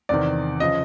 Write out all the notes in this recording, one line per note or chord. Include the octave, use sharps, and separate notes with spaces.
E2 C3 D#3 D5
C#3 F3 D#5